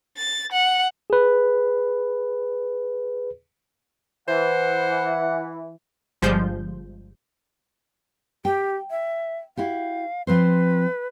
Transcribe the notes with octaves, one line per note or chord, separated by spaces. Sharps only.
A6
F#5
G#4 B4
E3 C5 F#5
G1 F3 G3 G#3 C5 G6
G4 G5
E5
E4 F#4 G4 F5
F3 C4 B4 C5